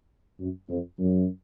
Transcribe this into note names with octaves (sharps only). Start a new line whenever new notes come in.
F#2
F2
F#2